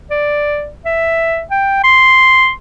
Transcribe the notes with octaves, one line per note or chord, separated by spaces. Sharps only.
D5
E5
G5
C6